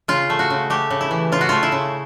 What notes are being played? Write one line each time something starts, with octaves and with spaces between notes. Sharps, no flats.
C#3 F4
A3
F#4
C#3
A3 G4
C#3
E4
E3
C#3 F4
F#4
A3 F4
E4
C#3